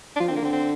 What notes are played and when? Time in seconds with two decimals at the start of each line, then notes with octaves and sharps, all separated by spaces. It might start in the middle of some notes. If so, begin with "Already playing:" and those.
0.16 D4
0.20 F3 F4
0.28 D3 C4
0.36 A#3
0.42 D3 C4
0.53 C4